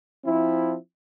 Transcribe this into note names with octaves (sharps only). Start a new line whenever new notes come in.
F3 C4 E4